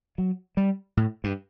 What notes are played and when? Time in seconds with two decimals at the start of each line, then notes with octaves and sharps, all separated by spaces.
0.18 F#3
0.57 G3
0.97 A2
1.24 G2